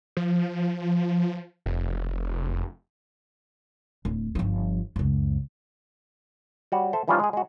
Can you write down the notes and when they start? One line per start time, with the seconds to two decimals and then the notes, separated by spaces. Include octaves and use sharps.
0.17 F3
1.66 F1
4.05 D1
4.35 G1 F3
4.96 C#2 F#2
6.72 G3 F#4 C#5
6.93 A4 C5 E5
7.08 E3 F3 G3 C#4 D#4 F4
7.20 G#3 G#4
7.33 G#3 F#4